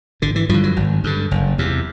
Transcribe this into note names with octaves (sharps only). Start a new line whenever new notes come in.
G#1 D3
E3
G2 D3 F3
F#3
G#1
G2 D3
F#1
E2 C3